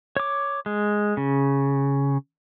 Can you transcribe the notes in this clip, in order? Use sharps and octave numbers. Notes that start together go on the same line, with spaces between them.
C#5 D6
G#3
C#3